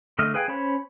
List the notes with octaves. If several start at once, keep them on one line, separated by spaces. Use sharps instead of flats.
D3 A3 D#5 F6
G#4 B4 F5 G5 G#5
C#4 C5 C#5 B5